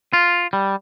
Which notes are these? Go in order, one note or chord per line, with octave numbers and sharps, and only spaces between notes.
F4
G3